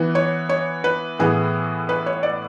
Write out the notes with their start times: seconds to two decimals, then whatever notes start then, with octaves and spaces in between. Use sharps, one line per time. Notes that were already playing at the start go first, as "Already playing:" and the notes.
Already playing: E3 B3
0.15 C#5
0.49 C#5
0.84 B4
1.19 A2 E3 B3 G#4
1.89 B4
2.06 C#5
2.23 D5